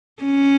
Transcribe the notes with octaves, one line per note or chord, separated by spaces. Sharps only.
C#4